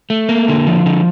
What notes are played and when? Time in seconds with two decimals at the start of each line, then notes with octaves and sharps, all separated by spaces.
0.10 A3
0.29 A#3
0.48 D3
0.67 F3
0.86 D3